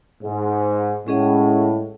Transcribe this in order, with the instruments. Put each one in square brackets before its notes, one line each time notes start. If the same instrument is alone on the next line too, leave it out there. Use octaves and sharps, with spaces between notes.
[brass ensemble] G#2
[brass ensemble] A2 [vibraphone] G#3 C#4 G#4 D#5 F#5